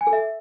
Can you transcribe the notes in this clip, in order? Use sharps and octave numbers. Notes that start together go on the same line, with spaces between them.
G#5
A4
E5